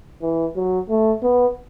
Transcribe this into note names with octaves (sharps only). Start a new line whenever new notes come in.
E3
F#3
A3
B3